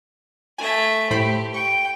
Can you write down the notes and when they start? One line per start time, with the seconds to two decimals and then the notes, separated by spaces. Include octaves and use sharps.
0.58 A3 E5 G#5
1.11 A2 G4 C5 B5
1.54 G5 C#6